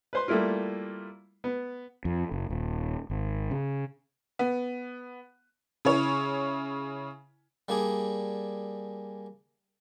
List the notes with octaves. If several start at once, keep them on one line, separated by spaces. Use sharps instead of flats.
B4 C5 C6
G3 A3 A#3 E4 F4
B3
F2
F#1
D#1
G#1
C#3
B3
C#3 E4 C#5
G3 A#3 D4 G#4